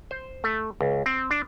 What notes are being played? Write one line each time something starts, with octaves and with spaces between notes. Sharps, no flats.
C5
A3
C#2
C4
D4